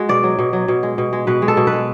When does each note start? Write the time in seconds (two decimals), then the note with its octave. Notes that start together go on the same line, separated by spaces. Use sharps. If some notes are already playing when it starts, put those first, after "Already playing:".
Already playing: G#3 F#4
0.09 B2 D5
0.23 F#3
0.39 B2
0.53 F#3
0.68 B2
0.83 G#3
0.98 B2
1.13 G#3
1.27 B2 B4
1.42 G#3
1.48 A4
1.57 B2
1.67 B4
1.72 G#3